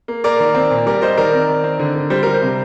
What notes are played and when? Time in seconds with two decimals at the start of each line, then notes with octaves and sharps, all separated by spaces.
0.08 A#3
0.24 A#3 A#4 D5
0.40 D#3
0.55 C4
0.70 A#2
0.86 G3 A#4 D5
1.01 G3 C5 D#5
1.18 D#3 A#4 D5
1.34 C4
1.49 D#3
1.64 C4
1.79 D3
1.95 D3
2.10 G3 C5
2.23 G3 A#4
2.34 C5
2.42 C3